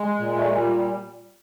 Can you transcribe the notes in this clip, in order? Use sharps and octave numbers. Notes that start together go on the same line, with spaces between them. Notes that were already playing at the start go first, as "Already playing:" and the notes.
Already playing: G#3
A#2
A3
G#3
G3